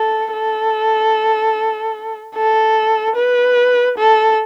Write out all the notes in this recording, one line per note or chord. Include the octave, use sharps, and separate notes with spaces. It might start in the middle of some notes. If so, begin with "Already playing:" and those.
Already playing: A4
A4
A4
B4
A4